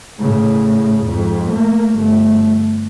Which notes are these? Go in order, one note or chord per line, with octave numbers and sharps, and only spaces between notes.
A2 C#3
F2 G#2
A3 A#3
G1 A3